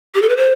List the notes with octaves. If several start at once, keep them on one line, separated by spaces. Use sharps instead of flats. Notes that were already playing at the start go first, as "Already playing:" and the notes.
G4
A4
B4
C5